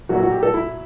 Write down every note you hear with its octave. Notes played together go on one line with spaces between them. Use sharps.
A#2 F#3 A3 F#4
F#4
G4
A4
E4